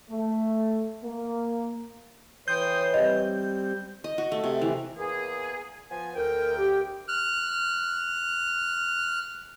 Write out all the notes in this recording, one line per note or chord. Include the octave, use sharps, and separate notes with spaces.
A3
A#3
E3 B4 C#5 G5 C6 D#6 G6
G3 C4 D#5
D#5
F#4
A3
C3
E3
E2 A#3 G#4
F3 B3 G#5
D2 A#4 G5
G4
F6 F#6